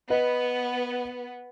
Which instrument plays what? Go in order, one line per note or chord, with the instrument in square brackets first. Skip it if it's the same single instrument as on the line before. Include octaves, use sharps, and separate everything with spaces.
[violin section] B3 [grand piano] B4 D#5